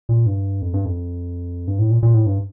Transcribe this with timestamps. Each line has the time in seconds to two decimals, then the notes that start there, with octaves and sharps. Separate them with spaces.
0.09 A#2
0.26 G2
0.62 F2
0.73 G2
0.85 F2
1.68 G2
1.79 A2
1.91 A#2
2.03 A#2
2.14 A2
2.26 G2